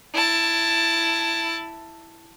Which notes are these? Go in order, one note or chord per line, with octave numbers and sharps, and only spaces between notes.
E4 A5